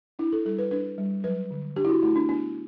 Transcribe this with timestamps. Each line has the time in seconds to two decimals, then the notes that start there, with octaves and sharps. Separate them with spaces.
0.19 D4 E4
0.32 A4
0.45 G3 A4
0.58 B4
0.71 D4 B4
0.98 G3
1.24 F#3 B4
1.51 D3
1.76 D4 G4
1.85 E4
1.89 F#4
2.03 A3 E4
2.16 D4
2.29 B3 D4